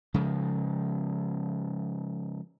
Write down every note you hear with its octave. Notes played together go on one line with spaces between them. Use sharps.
C#3 F3 G#3